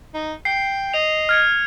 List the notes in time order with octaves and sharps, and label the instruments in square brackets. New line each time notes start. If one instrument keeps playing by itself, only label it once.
[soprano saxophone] D#4
[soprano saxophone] G5 [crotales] C7
[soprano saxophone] D#5 [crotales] F7
[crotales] F6 G#6 C#7